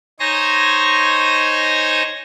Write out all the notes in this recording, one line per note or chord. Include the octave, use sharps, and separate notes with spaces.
D#4 C5 C#5 G#5 C#6 A#6